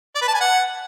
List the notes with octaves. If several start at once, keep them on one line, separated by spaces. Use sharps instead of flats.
D5
B4
A5
G#5
F#5